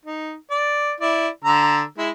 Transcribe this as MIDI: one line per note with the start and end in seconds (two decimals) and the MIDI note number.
0.05 0.34 63
0.51 0.93 74
1.00 1.28 64
1.00 1.28 74
1.44 1.82 50
1.44 1.82 82
1.44 1.82 88
1.98 2.10 56
1.98 2.10 64